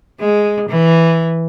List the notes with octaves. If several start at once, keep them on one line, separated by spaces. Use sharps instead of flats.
G#3
E3